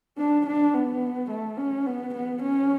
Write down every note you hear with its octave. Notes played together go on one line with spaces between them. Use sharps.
D4
D4
B3
A3
C#4
B3
B3
C#4